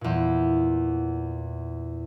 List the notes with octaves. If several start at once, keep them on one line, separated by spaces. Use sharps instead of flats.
E2 A#2